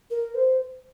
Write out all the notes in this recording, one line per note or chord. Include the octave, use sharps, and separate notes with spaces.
A#4
C5